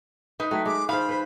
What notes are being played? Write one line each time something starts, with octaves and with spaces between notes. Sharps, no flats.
D#4 B4
F#3 A3 G5
G#3 D6
D#3 F4 C5 F5 B5
B4 C5